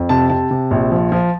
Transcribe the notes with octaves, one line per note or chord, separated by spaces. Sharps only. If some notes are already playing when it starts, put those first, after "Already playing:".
Already playing: F2
C3 A5
C3 A5
C3
A#1
F3
F3